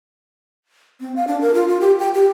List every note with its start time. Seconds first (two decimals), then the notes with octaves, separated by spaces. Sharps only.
1.00 C4
1.16 F5
1.28 D4
1.41 A#4
1.54 F4
1.68 F4
1.81 G4
1.99 G5
2.14 G4